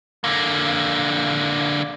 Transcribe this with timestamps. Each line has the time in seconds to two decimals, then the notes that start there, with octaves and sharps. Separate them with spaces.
0.24 D3 A#3